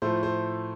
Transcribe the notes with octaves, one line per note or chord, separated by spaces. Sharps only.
A2 F3 A3 C5
C5